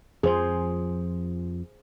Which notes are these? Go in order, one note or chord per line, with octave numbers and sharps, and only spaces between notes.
F2 F3 G#4 C5